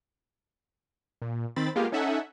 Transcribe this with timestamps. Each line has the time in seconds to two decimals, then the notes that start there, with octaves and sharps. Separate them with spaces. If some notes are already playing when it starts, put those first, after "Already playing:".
1.22 A#2
1.56 D#3 C4 B5 A6
1.76 G#3 A#3 B3 F4 G4 F5
1.92 C#4 D#4 A4 E5 F#5 G#5